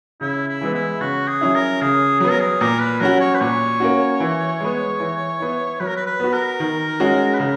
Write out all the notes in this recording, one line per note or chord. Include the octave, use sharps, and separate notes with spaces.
C#3 E4
E4
E3 G#3 B3
E4
C#3 F#4
G#4
F#3 C#4 E4
A#4
C#3 G#4
F#3 B3 G#4
A#4
G#4
A#2 A#4
B4
F#3 C#4 F#4 A#4
C#5
B4
A#2 C#5
A#3 C#4 F#4
E3
G#3 B3
E3
B3 E4
F#3 B4
A#4
B4
B4
B3 F#4
A#4
D#3
G#3 C#4 F#4
B4
C#3 A#4